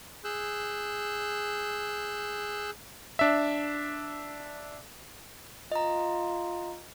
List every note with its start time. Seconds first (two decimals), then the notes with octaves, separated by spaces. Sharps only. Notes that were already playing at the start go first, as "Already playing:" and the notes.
0.24 G#4 E6 F#6 G6
3.19 D4 E5
5.72 F4 D#5 A#5